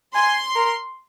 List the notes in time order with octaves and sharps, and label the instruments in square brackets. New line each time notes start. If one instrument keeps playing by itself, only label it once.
[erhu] G#5 [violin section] C6
[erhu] A#4